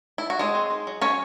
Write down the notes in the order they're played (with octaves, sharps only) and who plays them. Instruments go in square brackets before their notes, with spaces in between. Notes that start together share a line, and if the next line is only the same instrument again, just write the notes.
[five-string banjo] E4
F#4
F#3 G#3 G#4
C4
D#4
F#3
F#3 C#4 C#5